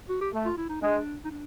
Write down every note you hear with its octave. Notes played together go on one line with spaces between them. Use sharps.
F#4
G4
A3
F4
E4
D#4
G#3 D4
D#4
D4